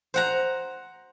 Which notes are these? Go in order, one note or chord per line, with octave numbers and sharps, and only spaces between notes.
C5 F#5 A#5